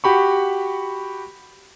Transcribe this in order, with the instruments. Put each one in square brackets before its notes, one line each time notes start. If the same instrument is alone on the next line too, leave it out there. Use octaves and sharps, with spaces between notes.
[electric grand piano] F#4 G4 B5 C#6